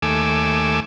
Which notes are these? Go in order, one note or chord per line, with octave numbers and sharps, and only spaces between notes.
D#2 A3 G#5 D6 E6